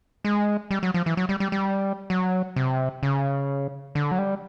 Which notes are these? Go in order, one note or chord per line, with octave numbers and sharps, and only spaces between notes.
G#3
G3
F#3
F3
E3
F#3
G3
G3
G3
F#3
C3
C#3
D3
F#3
G3